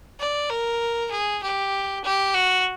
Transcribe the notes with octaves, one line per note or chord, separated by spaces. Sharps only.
D5
A#4
G#4
G4
G4
F#4